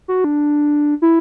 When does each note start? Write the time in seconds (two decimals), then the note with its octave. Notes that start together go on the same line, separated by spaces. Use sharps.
0.08 F#4
0.24 D4
1.02 E4